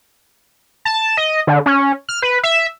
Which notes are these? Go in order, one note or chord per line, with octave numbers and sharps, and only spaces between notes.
A5
D#5
D3
C#4
F6
B4
E5